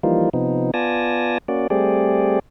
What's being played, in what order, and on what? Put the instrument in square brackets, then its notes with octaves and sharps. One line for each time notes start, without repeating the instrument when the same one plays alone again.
[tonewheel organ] E3 F3 G3 A#3 D#4 F4
C3 F3 B3 D#4
B3 F4 D5 G#5 A5 A#6
A#3 C#4 F#4 D5
G3 A3 C4 G4 G#4 D5